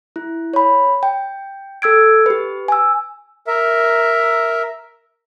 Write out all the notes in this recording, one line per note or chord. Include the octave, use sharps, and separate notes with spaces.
E4
C#5 B5
G5
A4 E6 G#6 D7
G4 B4
G#5 E6
A#4 E5